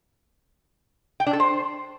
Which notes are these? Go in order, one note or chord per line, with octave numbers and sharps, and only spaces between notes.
G5
D4
A4
C5